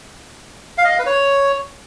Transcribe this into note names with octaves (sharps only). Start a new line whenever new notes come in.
F5
D#5
F5
B4
C#5